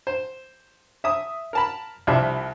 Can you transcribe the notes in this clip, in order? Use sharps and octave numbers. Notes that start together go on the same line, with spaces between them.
C5
E5 D#6
A#4 A5 B5
C2 C3 F3 D4 E5